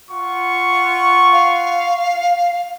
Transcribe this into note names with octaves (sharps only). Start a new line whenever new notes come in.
F4 F#5 C#6
F5